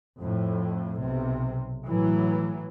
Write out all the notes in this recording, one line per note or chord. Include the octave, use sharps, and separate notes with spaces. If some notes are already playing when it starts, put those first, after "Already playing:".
F2 A2
B1 C3
A2 E3 F#3